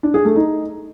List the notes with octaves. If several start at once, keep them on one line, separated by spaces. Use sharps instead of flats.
D4
G#4
A3
D#4